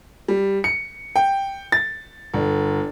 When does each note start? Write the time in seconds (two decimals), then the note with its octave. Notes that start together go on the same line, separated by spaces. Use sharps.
0.28 G3
0.64 C#7
1.16 G5
1.72 A6
2.34 G1